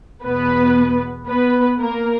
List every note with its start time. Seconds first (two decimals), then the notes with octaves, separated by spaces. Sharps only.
0.24 E2 B2 B3 B4
1.27 B3 B4
1.79 A#3 A#4